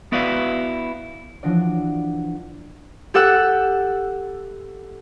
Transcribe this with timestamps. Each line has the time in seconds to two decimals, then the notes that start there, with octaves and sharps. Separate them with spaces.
0.12 B3 E4 F#4 B4 D5 F5
1.43 E3 F3 D4 F#4 D5
3.14 G4 A4 F#5 E6 F#6